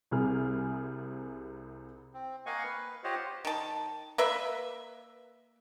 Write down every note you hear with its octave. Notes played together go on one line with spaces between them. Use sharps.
C2 C3 G#4 F6
C4
A#3 D#5 F5 F#5 G#5 C#6
B4
F4 G4 C5 C#5 D#5 F#5
D#3 A5
A#3 B4 E5